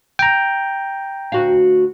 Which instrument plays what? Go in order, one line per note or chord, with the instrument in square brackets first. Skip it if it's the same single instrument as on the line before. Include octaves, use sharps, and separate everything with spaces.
[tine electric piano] G5 A#5
[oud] D2 F#4 F5